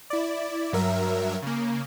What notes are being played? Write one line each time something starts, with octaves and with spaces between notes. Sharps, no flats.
E4 D5
G2 F#3 A#4 E5
C#3 A#3